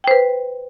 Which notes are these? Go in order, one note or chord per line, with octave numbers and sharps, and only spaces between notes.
B4 C5 G5